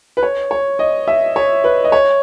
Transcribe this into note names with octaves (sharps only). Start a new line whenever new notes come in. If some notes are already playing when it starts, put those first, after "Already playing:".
B4
C#5
C#5
D#5
E5
C#5
B4
D#5
C#5